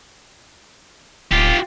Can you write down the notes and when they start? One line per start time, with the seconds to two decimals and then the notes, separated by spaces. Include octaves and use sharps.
1.31 D1 F4 G4